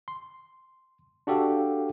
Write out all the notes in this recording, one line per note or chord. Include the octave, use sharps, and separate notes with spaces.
C6
D4 F#4 G4 A4 F5